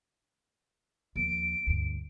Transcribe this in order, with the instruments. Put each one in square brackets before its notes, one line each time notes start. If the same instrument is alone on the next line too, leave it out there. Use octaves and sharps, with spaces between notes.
[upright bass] D#2 F3 [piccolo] D7
[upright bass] D2 G2